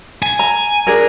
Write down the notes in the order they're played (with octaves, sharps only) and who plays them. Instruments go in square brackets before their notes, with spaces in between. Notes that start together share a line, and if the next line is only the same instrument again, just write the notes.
[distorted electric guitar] G#5
[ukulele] A#5
D4 G#4 A#4